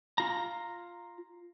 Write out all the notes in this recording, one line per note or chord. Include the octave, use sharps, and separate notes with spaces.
F4 A#5